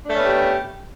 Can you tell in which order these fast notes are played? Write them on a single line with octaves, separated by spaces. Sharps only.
D4 A3 C#4 B3 G4